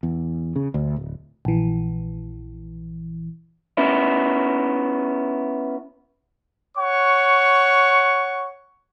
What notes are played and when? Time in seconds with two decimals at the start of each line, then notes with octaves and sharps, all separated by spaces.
0.03 E2
0.56 C#3
0.74 D2
0.96 D1
1.45 A#1 E3
3.77 B3 C#4 E4
6.77 C#5 F#5 C#6